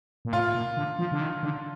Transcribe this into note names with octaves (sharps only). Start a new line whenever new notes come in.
A#2
A2 F4
A#2
D3
F3
D3
D#3
D3